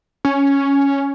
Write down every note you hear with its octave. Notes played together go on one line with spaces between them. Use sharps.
C#4